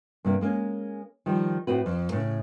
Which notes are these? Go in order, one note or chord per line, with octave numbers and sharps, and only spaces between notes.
G2 C3 A#3
G#3 A#3 C#4
D#3 F3 G3
A2 C4 F#4 B4
F2
A2 C#3